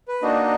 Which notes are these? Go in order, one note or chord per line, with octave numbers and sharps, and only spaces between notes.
B4
A#3 D4 D#4 F#4 D#5